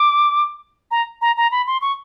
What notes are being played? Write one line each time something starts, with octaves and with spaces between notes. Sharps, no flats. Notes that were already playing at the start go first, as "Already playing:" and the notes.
Already playing: D6
A#5
A#5
A#5
B5
C6
C#6